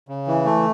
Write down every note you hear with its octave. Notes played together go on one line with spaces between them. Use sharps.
C#3
E3
A3